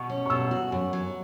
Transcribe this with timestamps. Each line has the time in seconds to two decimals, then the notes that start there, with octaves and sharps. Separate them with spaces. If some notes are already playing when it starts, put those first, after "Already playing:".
Already playing: B2 C#6
0.10 C#4
0.26 C#6
0.30 B2 E6
0.51 F#4
0.72 F#2
0.93 F#3